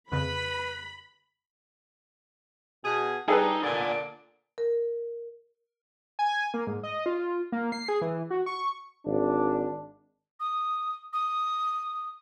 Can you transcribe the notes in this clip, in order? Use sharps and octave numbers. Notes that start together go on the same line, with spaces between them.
F2 C#3 B4 B5
B2 G#4
G3 D#4 G#4 A4 B4
A#2 D3 D5 G#5
A#4
G#5
A#3
G#2
D#5
F4
A#3
C7
G#4
E3
F#4
C#6
G#1 D4
D#6
D#6